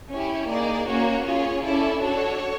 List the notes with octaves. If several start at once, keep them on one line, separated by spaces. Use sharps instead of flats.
C#4 E4 G4 C#5
A#3 D#4 G#4 D5
A#3 C#4 F#4 C#5
C#4 F4 G#4 C#5
C#4 E4 A4 D5
D4 F#4 A4 C#5